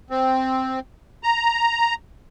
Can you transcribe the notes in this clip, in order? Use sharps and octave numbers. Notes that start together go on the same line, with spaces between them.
C4
A#5